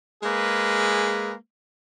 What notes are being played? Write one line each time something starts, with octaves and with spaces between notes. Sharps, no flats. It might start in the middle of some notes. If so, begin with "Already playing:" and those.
G#3 A#3 G#4 B4